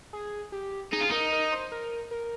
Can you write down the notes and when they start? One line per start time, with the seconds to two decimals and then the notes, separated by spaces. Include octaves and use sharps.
0.13 G#4
0.52 G4
0.92 D#4 G#4
1.01 F4
1.10 D#4 A#4
1.32 A#4
1.52 C5
1.72 A#4
2.11 A#4